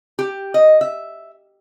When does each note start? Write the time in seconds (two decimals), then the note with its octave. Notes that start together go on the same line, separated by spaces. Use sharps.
0.19 G4
0.54 D#5
0.81 E5